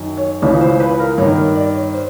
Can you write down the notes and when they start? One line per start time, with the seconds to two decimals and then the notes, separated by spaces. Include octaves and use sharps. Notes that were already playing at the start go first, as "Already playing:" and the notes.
Already playing: F#2 D#3
0.17 C#5
0.42 C#2 C#3 E3 C#5
0.61 C5
0.80 B4
0.99 A#4
1.18 G2 D#3 C#5
1.37 A#4
1.55 D5
1.75 C#5
1.94 C5